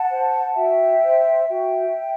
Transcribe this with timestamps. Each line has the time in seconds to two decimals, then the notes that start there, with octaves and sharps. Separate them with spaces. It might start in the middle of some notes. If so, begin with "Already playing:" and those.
Already playing: F#5 A5
0.10 C5
0.55 F#4 E5 G5
1.02 C5
1.48 F#4 E5 G5